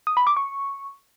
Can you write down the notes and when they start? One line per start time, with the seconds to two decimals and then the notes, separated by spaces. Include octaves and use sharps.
0.07 D#6
0.17 B5
0.27 D6
0.37 C#6